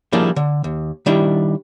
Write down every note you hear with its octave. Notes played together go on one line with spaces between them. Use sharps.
F3 G3 A#3 D4 E4 G#4
D3
D#2
D#3 G3 D4 E4